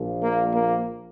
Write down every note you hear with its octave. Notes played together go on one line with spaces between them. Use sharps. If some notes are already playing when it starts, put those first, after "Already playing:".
Already playing: A#1 A#2 F3
A#3
A#3